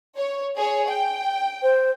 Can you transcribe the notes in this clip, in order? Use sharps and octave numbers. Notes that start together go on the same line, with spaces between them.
C#5
G#4 C#5
G5
C5